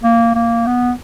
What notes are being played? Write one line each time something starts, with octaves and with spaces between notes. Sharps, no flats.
A#3
A#3
B3